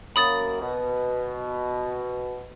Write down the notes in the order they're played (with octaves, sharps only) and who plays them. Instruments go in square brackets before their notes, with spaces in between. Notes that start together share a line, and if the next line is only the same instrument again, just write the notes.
[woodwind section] F#2 A#3 [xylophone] B5 D#6 A6
[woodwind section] B2